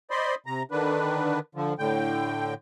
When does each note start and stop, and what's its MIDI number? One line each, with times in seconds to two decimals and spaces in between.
0.11 0.35 72
0.11 0.35 74
0.11 0.35 75
0.11 0.35 83
0.11 0.35 84
0.46 0.63 48
0.46 0.63 82
0.71 1.39 50
0.71 1.39 51
0.71 1.39 62
0.71 1.39 71
1.55 1.74 50
1.55 1.74 53
1.78 2.54 45
1.78 2.54 50
1.78 2.54 79